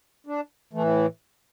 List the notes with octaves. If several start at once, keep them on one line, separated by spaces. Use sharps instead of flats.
D4
A2 E3 A3